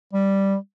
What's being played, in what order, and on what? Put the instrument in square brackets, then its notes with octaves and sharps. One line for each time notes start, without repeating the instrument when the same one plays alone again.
[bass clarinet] G3